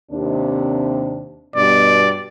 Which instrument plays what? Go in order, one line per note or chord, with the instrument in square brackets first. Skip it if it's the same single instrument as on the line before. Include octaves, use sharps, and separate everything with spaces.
[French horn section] D#2 C3 D4
[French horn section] G2 B2 [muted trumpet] D5